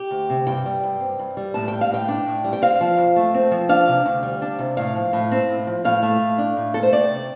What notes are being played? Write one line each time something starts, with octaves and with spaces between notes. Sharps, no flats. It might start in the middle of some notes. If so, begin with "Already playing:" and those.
Already playing: G4
D2
C3
G2 G5
G3
G2
C4
G2
G3
A2 A5
G3 G5
F5
A2 G5
D4
A2
G3
G5
C4 F5
F3
F2
A3
C4
F3
D4 F5
C3
D2
G3
D4
C3
A2 F5
F3
A2
C4
A2
F3
A2 F5
A3
A2
D4
A2
A3 A4
C5
C4 D5
C3